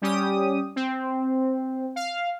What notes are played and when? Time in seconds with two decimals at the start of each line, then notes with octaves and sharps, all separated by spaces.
0.02 G3 C#4 G4 D#6
0.76 C4
1.96 F5